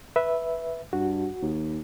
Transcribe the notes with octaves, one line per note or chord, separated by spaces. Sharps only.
B4 E5
G2 F#4
D#2